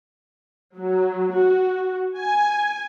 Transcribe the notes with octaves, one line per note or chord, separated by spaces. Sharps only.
F#3
F#4
G#5